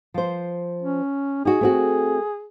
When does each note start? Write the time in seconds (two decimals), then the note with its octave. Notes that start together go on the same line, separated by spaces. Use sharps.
0.14 F3 C5
0.82 C#4
1.45 D#4 F#4 G#4
1.61 A3 C4 F#4